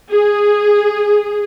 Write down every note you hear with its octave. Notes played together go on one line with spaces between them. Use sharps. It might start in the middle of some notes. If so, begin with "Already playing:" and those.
G#4